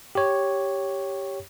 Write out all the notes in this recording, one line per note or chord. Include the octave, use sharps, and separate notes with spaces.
G4 C#5